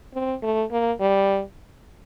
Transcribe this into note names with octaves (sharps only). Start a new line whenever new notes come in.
C4
A3
A#3
G3